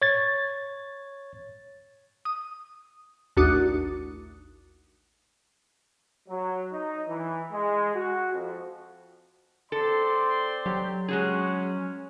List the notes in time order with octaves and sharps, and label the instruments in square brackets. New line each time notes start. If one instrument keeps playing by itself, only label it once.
[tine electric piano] C#5 G#6 A6
[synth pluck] D#6
A1 D#2 D4 F#4 D#6
[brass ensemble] F#3
D#4
E3
G#3
F#4
F2
[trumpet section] C4 D5 C6 [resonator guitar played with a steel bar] A4
[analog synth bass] F#3 [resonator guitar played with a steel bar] G4
[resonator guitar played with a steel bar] G#3 F#4 G#4 [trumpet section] C#4